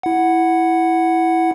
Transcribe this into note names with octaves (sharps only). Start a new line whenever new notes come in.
E4 F#5